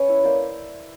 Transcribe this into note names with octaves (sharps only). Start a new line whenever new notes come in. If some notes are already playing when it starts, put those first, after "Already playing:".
Already playing: C#4 B4 C#5
E4
A#3 C5 D5